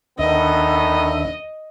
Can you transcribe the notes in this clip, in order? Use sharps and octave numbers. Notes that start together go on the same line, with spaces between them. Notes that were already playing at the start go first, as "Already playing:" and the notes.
D#2 D3 D#3 B3 D4 D#5 E5